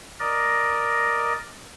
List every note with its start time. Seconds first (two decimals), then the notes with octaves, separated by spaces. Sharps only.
0.20 A#4 D5 D#5